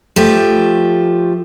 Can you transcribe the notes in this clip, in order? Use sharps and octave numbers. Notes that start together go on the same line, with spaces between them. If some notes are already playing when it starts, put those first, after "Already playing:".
F3 A3 G4